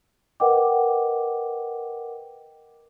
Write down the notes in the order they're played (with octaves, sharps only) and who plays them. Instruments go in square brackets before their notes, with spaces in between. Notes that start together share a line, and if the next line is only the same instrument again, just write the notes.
[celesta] A#4 B4 D#5 F#5 G5 D6